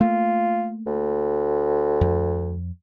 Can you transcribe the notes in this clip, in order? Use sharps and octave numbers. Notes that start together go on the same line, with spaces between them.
A3 A#3 F4
D2
F2